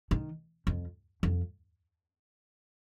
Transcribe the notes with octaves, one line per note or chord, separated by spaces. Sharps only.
D#3
F2
F2